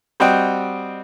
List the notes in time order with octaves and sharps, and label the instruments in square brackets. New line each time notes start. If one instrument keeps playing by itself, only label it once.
[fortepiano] G3 C4 F#4 D#5 G5